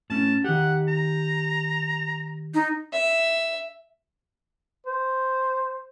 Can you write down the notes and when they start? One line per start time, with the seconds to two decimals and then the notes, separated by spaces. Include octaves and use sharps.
0.10 A2 C#4 A5
0.44 D#3 G4 F#5
0.88 A#5
2.54 D#4
2.93 E5
4.87 C5